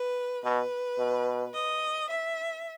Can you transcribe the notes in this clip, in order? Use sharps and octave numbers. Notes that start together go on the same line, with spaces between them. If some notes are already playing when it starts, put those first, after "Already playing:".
Already playing: B4
B2 B4
B2
D#5
E5